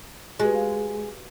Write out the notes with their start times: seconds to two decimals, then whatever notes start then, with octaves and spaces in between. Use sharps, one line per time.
0.40 G#3 F#4 G4 B4
0.55 F5